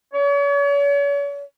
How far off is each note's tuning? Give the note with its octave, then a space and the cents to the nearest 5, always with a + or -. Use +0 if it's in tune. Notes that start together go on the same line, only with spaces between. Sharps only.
C#5 +40